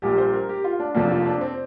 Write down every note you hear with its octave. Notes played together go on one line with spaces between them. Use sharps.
A#1 A#2 G3 A#3 G4
C5
A#4
G4
F4
D4
F1 F2 F3 A#3 D4
F4
D4
C4